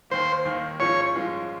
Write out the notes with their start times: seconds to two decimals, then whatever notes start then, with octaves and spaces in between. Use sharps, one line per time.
0.10 D#2 D#3 A#3 C5
0.45 D#2 D#3 A#3
0.80 G#2 F3 G#3 C#4 F4 C#5
1.15 G#2 F3 G#3 C#4 F4